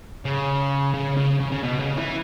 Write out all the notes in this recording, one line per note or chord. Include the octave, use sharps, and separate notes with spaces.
C#3
C#3
C#3
C#3
C#3
B2
C#3
E3